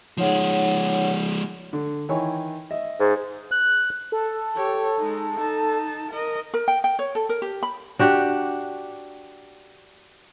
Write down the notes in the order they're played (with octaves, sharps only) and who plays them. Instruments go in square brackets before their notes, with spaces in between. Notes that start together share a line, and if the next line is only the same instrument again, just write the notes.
[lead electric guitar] F3 G#3 [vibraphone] D#4 C#5 F#5
[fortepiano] D3
D#3 E3 C#5
D#5 E5
[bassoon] G#2
[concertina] F#6
[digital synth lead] A4
[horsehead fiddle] G4 C#5
G#3 D#4
D#4 A5
A#4 D#5
[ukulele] A#4
G5
G5
C#5
A4
A#4
G4
B5
[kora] D4 F#4 G4